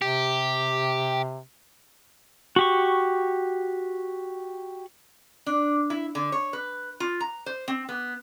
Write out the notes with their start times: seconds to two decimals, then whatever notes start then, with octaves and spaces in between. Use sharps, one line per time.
0.02 C3 G4
2.56 F#4 G4 C#6
5.46 D4
5.90 E4
6.15 D3
6.32 C#5
6.53 B4
7.00 F4
7.20 A#5
7.46 C5
7.68 C4
7.89 B3